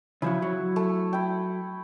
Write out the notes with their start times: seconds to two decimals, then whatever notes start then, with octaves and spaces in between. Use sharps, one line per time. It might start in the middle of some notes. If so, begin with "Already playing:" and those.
0.22 C#3 F3 F#3 E4
0.42 F#3
0.76 A3
1.13 E4 G5